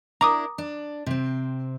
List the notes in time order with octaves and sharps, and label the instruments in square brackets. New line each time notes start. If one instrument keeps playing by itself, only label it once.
[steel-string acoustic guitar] D4 E4 A#4 [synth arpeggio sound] A#5 D6 D#6
[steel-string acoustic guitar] D4
C3 C4